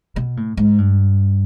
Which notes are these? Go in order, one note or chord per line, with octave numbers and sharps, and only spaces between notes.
B2
A2
G#2
G2